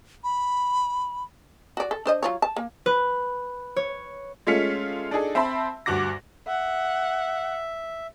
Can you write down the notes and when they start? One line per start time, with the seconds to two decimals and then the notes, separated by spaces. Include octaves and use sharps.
0.24 B5
1.77 F#4 D5
1.91 A4
2.06 D4 C5 D#5
2.23 F#3 F4 C#5
2.42 A5
2.56 A#3
2.86 B4
3.76 C#5
4.47 G#3 A3 C#4 F4 B6 C#7
5.11 D4 D#4 G#4 A4
5.35 C4 E5 A5 B5 C6
5.86 D2 G2 F#4 D6 A#6
6.47 E5 F#5